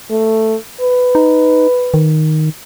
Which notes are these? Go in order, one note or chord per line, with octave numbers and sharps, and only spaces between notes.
A3
B4
D#4
D#3